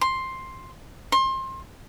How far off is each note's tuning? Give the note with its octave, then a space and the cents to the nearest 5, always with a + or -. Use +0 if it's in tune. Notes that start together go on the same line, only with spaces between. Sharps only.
C6 +5
C6 +25